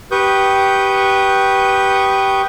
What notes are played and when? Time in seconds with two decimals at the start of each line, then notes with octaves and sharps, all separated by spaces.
0.11 G4 B4 C#6 D#6 G6